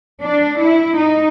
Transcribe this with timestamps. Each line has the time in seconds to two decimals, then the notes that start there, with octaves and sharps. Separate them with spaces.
0.21 D4
0.59 E4
0.96 D#4